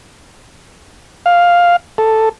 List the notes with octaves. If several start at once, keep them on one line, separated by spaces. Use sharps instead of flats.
F5
A4